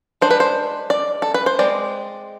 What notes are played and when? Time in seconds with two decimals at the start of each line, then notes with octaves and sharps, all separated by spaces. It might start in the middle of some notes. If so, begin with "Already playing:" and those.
0.21 G#3 D4 C5
0.31 B4
0.40 C5
0.90 D5
1.22 A4
1.34 B4
1.46 C5
1.59 G#3 C4 D5